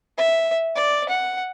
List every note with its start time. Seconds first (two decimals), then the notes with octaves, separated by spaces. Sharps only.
0.18 E5
0.76 D5
1.09 F#5